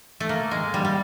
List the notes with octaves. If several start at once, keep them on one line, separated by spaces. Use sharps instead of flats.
A3
A#3
G#3
G3
G3